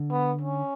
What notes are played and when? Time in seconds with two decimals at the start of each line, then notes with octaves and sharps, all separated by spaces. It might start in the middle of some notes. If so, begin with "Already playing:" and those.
Already playing: D3
0.11 B3
0.41 C#4